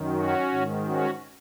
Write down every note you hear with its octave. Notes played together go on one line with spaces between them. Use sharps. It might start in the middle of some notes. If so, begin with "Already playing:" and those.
Already playing: F#2 D#3
C#4 F#4
G#2 D#3
C#4 F#4